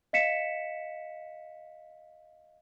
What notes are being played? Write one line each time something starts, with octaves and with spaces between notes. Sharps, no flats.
D#5 F5 B6 C#7 E7